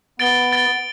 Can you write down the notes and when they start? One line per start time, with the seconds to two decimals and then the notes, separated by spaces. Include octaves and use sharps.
0.19 B3 A6 D7 G7
0.52 A6 D7 G7